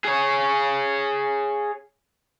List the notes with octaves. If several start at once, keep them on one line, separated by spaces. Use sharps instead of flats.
G#4 C#5